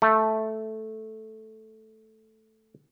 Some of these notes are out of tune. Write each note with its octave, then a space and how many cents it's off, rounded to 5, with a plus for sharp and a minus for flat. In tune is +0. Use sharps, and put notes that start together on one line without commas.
A3 -5